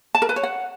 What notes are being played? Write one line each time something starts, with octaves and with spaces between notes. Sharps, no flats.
A5
A#4
B4
C#5
F#5